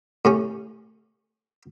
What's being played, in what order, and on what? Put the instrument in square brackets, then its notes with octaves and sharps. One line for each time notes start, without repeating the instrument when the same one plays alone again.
[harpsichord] A2 C3 C#4